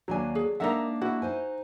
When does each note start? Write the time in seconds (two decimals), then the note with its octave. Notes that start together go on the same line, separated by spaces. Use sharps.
0.08 D#2 F#3 A#3 D4 G#5
0.35 G#4
0.60 G#3 A#3 D4 D#4 A#4 E5 F#5 A#5
1.02 E4 F#4
1.22 D#4 C5 G#5